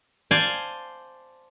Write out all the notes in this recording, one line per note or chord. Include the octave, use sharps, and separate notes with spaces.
C5 D5 F5 G#5 A5